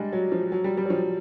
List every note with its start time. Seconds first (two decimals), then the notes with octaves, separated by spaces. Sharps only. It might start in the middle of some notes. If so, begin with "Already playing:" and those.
Already playing: G3 G#3 D4
0.13 F#3
0.32 F3
0.52 F#3
0.64 G3
0.77 G3
0.85 F#3
0.90 F3